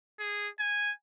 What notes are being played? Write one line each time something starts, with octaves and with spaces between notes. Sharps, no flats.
G#4
G#5